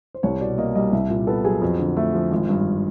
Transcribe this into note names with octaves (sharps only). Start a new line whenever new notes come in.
C5
C2 C#5
B2 D5
A#3 D#5
G3 D#5
C2 E5
A#2
B3 A4
F#3 G#4
F2
D3
A3
F3
G#1
G2